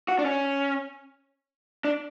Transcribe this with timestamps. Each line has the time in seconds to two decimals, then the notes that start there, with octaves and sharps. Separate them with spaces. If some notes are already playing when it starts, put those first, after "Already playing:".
0.08 F#4
0.19 D4
0.25 C#4
1.85 D4